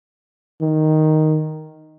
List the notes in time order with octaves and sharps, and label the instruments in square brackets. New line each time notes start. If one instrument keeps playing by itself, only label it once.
[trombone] D#3